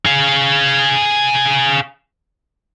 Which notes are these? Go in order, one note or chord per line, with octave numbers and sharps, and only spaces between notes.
G#4 F5